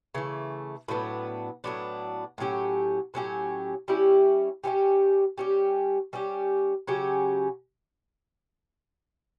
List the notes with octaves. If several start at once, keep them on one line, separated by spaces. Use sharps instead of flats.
C#3 E3 A3
A2 F#3 B3 D4
A2 F#3 B3 D4
A2 F#3 C#4 G4
A2 F#3 C#4 G4
G3 C#4 E4 G4
G3 C#4 E4 G4
G3 C#4 G4
G3 C#4 G4
C#3 F#3 C#4 G4